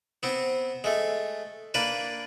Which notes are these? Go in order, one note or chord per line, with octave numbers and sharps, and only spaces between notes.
B3 C4
G#3 A3
A#3 D4 B4